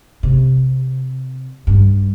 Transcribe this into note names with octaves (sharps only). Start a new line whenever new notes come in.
C3
G2